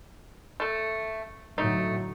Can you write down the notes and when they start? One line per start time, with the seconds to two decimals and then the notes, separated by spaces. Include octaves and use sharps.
0.60 A3 A4
1.58 A2 D3 F#3 A3 D#4